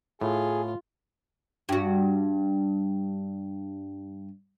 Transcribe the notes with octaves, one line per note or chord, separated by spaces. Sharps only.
A2 F4 G#4
G2 F#4